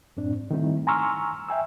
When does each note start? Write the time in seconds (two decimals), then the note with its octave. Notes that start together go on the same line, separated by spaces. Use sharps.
0.17 F#2 A2 C4 D4
0.32 G#2
0.51 D#3 G3 A3 C4 D#4 E4
0.87 G#5 A#5 C6 C#6 E6 F6
1.49 E5 G5 G#5 E6